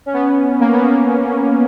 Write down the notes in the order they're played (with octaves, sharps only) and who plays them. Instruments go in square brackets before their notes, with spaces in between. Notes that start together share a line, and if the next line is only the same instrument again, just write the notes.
[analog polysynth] C#4
B3
A#3
B3
A#3